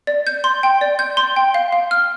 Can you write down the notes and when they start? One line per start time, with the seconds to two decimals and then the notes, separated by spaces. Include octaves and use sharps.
0.07 D5
0.27 G6
0.44 C6
0.63 G5
0.81 D5
0.99 G6
1.17 C6
1.36 G5
1.54 F5
1.72 F5
1.91 F6